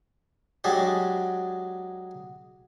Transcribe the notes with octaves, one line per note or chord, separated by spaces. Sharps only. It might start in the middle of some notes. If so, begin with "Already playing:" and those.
F#3 G#3 D4 G4